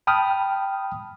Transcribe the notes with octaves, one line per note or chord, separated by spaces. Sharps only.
G5 A5 B5 D#6 F6